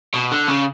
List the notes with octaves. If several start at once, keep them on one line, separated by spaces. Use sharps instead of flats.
B2
D3
C#3